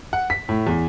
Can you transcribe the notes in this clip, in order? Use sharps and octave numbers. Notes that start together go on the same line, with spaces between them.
F#5
B6
A2
E2